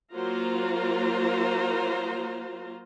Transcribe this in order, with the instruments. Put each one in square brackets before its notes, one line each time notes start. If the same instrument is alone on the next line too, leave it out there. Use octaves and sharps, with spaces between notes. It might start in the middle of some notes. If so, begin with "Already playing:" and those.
[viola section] F#3 A#3 F4 C5 A#5